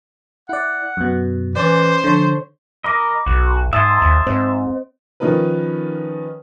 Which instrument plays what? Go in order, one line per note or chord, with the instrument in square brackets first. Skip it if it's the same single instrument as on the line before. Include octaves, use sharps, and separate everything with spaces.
[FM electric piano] E4 D5 [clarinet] F#5
[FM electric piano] F#2 B2
[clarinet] E3 [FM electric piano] C#4 D5 [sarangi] C5
[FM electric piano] D3 C#5 [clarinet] F3
[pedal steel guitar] A#4 D#5 [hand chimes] B5 D6
[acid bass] B1 [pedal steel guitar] F#4
[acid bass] G#2 [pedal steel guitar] E5 A5 C6 [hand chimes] D#6 G#6
[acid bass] D#2
[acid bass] G#2 [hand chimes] C4 C5 D#5
[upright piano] D#3 F3 C#4 D#4 A#4 B4